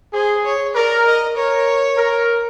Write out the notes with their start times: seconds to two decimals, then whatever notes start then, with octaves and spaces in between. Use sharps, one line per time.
0.14 G#4 C5
0.45 C#5
0.75 A#4 D5
1.06 D#5
1.37 A#4 C#5
1.98 A#4